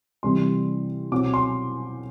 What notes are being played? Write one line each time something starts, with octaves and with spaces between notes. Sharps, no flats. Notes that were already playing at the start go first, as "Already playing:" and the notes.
C3 E3 G3 C6
B2 F#3 C4 D6
C6